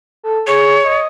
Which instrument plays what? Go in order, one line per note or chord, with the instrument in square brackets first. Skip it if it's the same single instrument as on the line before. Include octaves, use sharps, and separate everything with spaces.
[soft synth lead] A4
[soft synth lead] G#4 [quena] C#5
[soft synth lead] D#5